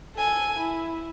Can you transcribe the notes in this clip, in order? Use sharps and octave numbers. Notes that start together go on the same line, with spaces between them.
A4 G#5
E4